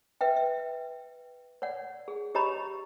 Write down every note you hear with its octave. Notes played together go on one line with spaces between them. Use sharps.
B4 E5 G5
E5
C#5 D5 F#5
G#4
G4 C#5 D#5 A#5 B5 C#6